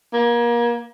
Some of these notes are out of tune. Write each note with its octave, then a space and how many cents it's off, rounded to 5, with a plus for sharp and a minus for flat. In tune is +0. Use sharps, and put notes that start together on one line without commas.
A#3 +30